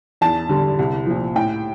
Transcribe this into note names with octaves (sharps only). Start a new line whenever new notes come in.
E2 A5
D3 G3
C2
A#2 F3
A2 G5